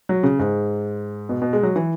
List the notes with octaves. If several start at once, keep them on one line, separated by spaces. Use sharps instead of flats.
F#3
C#3
G#2
B2
B2
G#3
F#3
E3